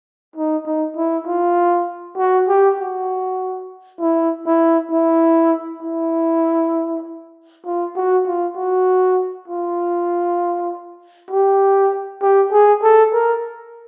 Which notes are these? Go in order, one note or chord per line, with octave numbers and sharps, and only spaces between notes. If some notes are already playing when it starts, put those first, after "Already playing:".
D#4
D#4
E4
F4
F#4
G4
F#4
E4
E4
E4
E4
F4
F#4
F4
F#4
F4
G4
G4
G#4
A4
A#4